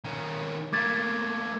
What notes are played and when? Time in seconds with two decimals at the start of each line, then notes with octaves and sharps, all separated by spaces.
0.05 D#3 C#4
0.73 A3 A#3 D6 G#6 A6